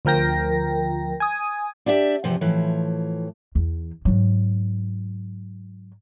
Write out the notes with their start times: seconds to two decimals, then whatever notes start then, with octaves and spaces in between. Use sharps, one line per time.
0.05 D2 F3 A#4 G5 A#6
1.20 G#5 D#6
1.86 D4 G4 D5 E5
2.24 E2 C3 F3
2.41 A2 E3 F3
3.55 E2
4.05 G#2 F#3